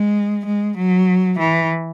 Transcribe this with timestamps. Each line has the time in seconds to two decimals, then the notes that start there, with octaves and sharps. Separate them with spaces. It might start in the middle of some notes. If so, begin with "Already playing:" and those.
Already playing: G#3
0.46 G#3
0.77 F#3
1.39 E3